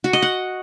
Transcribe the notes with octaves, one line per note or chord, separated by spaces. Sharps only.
F#4
D#5
F#5